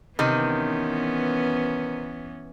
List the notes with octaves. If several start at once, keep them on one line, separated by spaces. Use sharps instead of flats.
C3 D#3 E3 B3 C#4